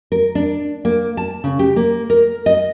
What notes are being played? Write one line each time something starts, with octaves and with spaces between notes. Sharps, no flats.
A#4
D4
A#3
A5
C#3
G4
A#3
A#4
D#5